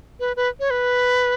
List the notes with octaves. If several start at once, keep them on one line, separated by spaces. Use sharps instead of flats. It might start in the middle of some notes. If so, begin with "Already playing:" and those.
B4
B4
C#5
B4